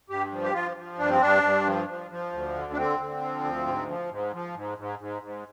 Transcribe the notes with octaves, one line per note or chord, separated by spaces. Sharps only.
G2 G4
F3
G4
F3 F4
F3
G2 D4
C4
G2 D4
G2
F3
F3
F3
D2
D3
D4
D3 C4
D3
F3
D2
G#2
F3
G#2
F3
G#2
G#2
G#2
G#2